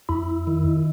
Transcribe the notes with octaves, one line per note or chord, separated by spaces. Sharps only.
F2 E4
D#3